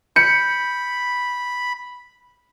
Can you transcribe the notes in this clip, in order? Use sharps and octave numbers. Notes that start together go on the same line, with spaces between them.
B5 G6 C#7